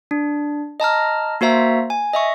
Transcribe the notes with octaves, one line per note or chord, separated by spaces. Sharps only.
D4
D#5 A5 A#5 F6
A#3 F#4 C5 E5 A#5
G#5
D#5 E5 C#6